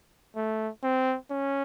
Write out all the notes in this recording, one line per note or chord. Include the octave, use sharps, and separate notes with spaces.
A3
C4
C#4